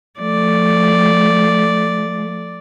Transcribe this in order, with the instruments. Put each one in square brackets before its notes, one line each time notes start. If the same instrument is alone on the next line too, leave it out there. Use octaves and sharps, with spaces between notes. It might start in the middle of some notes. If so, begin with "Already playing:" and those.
[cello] F3 A3 [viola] D5